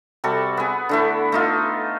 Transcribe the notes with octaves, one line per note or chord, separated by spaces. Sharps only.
C3 G3 F#4 A4
B3 G#4
D3 A3 E4
A3 D#4 F4